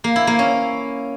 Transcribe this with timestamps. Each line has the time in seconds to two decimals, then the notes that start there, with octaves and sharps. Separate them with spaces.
0.04 A#3
0.16 E4
0.27 A#3
0.39 C#4